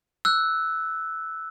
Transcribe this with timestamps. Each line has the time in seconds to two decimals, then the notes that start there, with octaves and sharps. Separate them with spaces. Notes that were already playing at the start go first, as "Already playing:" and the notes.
0.25 E6 F#6